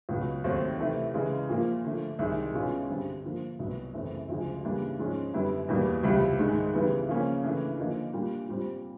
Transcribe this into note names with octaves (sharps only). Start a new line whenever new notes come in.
C#2 B2 F#3
D#2 D#3 F#3 A3 C4
C3 E3 A3
C#3 E3 G#3
A#2 F3 A#3
D3 F3 A3
C2 C3 D#3 G#3
B2 G#3 C#4 F4
G2 D3 G3 C4
D3 F3 A#3
C2 B2 F#3
F#2 C#3 E3 A3 C4
D2 C#3 F3 G#3
C#3 E3 G3 A#3 D4
G#2 F3 G#3 C#4
F#2 D3 G3 B3 E4
E2 B2 G3 A#3
C#2 C3 E3 G3
G#2 D#3 G#3
C#3 E3 G3 B3
C#3 F3 A#3 C#4
C#3 E3 A3 D4
D3 F3 A#3 D#4
A#2 G3 A#3 D4 F4
A#2 G3 C4